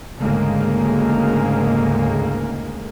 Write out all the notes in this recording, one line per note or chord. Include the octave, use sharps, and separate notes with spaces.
D2 G#2 C#3 G#3 A#3